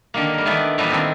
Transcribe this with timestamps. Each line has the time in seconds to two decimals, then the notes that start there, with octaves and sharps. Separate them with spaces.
0.14 D3 D#3 A#3
0.34 G3 A#4
0.45 D#3 E3 A3 B3 D5
0.78 A#2 E3 F3 G3 A3 B3
0.91 D#3 A3 C4